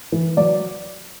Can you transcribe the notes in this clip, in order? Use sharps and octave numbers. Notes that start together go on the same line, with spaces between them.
E3
F#3 D5